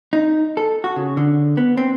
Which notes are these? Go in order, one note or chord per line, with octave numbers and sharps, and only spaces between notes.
D#4
A4
F#4
C#3
D3
B3
C4